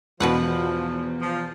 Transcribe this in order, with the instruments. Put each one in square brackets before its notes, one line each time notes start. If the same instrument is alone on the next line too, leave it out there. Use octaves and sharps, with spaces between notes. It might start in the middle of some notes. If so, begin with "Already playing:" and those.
[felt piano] E2 [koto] B2 B4 F#5 [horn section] F3
[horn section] F3